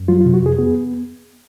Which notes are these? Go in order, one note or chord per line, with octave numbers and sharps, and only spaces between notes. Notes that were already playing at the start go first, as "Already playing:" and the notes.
Already playing: F#2
F#3 F4
F4
C3
F#4
F2 G#4
B3 G#4